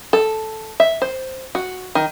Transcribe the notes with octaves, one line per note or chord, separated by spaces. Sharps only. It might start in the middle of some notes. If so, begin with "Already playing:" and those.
A4
E5
C5
F#4
D#3